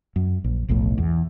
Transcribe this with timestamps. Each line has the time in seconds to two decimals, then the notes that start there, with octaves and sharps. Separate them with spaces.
0.16 F#2
0.44 A#1
0.68 F1 B1 F2 A2
0.98 E2